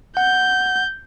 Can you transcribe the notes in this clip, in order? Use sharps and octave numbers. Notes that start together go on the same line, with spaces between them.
F#5 G6